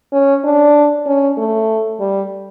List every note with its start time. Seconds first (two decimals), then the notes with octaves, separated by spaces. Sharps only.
0.13 C#4
0.44 D4
1.06 C#4
1.37 A3
2.00 G3